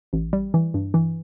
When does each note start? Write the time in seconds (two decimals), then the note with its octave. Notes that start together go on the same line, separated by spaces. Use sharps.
0.13 A1
0.33 G3
0.54 E3
0.74 G2
0.94 E3